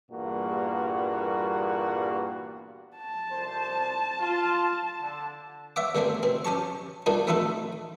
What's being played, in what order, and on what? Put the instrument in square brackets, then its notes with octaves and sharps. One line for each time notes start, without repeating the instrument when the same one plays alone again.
[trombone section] E2 G2 A#2 G3 A#3 F#4
[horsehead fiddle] A5
[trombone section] C2 F2 C5
F4
D3
[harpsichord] C#5 E5 F#5 D6
G2 D3 A3 A#3 C4
B2 C4
C#4 G4 A5 C#6
A#2 G3 A#3 D4 D#4 F#4
A3 C4 D#4 E4 F#4 A4